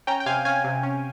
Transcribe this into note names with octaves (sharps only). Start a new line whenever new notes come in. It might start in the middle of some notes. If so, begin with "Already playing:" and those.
C#4 G5 A#5
G5
C3 F5 G#5
C#4 F5 G#5
C3
C#4